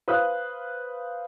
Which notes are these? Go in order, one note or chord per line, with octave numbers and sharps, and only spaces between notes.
B4 C5 F5 D#6 F#6